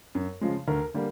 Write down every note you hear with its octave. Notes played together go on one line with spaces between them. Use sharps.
F#2
C#3 F3 G#3
D2 A#4
D3 G3 A#3